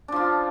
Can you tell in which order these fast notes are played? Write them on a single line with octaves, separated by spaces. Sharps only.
D4 F3 F4